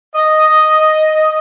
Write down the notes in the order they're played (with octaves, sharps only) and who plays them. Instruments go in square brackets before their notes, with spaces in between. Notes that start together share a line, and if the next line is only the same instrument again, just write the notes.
[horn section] D#5